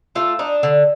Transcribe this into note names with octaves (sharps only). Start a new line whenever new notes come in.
A3 F4 A4
D4 D#4
D3